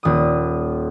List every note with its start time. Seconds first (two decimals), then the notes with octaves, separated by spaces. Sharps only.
0.03 D#1 D#6